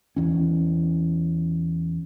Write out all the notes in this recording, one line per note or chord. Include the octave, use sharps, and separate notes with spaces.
E2 E3 C#4